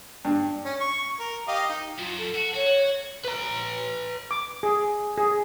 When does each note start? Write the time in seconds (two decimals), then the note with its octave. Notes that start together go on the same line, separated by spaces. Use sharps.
0.25 G2
0.65 C#4
0.80 C#6
1.20 A#4
1.48 G4 D#5 F5
1.69 D#4
1.99 F#2 F4
2.18 A4
2.35 F#4
2.55 F#4 C#5
3.25 B4 A#5
4.31 D6
4.63 G#4
5.18 G#4